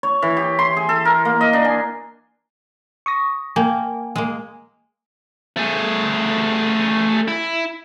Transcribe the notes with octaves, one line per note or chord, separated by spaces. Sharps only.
C#5
E3
G4
C6
G#4
A4
A#4
A#3
D#5
D4
G#5
C#6 D#6 A#6
A#3 G5 G#5
G#3 A#3
A3 G#4
E4